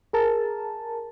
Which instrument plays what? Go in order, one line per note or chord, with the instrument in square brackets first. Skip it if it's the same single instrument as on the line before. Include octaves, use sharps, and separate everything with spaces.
[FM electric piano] G#4 A#4 A5